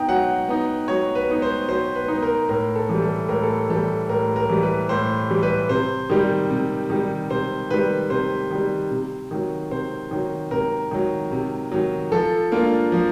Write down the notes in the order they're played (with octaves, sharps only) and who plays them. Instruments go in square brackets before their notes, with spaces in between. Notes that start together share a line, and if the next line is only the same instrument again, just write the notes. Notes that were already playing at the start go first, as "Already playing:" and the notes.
Already playing: [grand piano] B3 D#4 G5
F#3 F#5
B3 D#4
F#3 C#5
B4
B3 D#4
C5
F#3 C5
B4
B3 D#4
A#4
A2 A#4
A4
E3 G3
A4
A2 A#4
A4
E3 G3 A4
A2 A#4
A#4
E3 G3
B4
A2 C5
E3 G3
B4
C3 C5
D#3 G3
C3
D#3 G3
C3 C5
D#3 G3 B4
C3 C5
D#3 G3
C3
D#3 F#3
C3 C5
D#3 F#3
C3 A#4
D#3 F#3
C3
D#3 F#3
F3 A4
A#3 D4 F4
F3